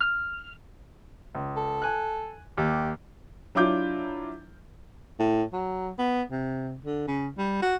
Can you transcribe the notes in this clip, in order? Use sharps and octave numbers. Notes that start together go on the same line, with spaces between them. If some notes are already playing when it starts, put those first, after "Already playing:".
F6
C#2
A4
G#5 F#6
D#2 G4
F#3 D4 E4 F4 D6 G6
A2
F#3
B3
C3
D3
C#3
G3
F#4